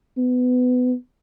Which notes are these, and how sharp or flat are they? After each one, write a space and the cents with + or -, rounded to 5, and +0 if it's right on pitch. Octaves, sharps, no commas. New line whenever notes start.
B3 +20